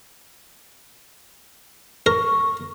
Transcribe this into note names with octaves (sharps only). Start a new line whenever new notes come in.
A#4 C#6